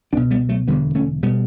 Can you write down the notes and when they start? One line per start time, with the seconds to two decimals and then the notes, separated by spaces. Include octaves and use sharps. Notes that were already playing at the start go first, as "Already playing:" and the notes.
0.13 C#2 B3 D4
0.17 B2
0.31 G3 B3
0.49 F#3 A3
0.68 E1 D2 D3 G3 B3
0.95 A3 C#4
1.23 B2 G3 B3